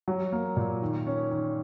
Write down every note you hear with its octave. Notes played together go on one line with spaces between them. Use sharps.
F#3
A#3
A#2
D#3
C#4
D#3